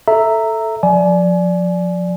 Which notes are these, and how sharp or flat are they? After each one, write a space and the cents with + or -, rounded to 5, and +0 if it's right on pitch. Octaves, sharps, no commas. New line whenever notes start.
A4 +0 E5 +0 A#5 -15
F3 +25 D5 +0 G#5 +30